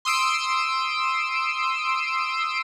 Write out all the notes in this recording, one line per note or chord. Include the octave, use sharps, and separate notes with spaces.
C6 D#6 E6 D7